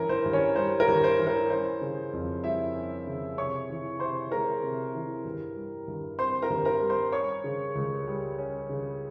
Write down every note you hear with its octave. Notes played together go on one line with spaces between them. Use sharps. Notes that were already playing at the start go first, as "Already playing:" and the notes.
Already playing: G2 E3 C#4 A#4
C5
G2
C#4 C#5
G3 C5
A#4
G2
C5
E3
A#4
C#4 C5
C#3
F2
G3 E4 E5
C#4
C#3
C3 C#5 C#6
E3
C3 C5 C6
G#3 A#4 A#5
C3
E3
G2
G3
G2
C4 C5 C6
A#4 A#5
G2
A#4 A#5
G3
C5 C6
C#4 C#5 C#6
C#3
C#2
G3
C#4
C#3